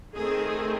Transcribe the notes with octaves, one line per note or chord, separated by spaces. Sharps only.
D#3 A3 C4 G#4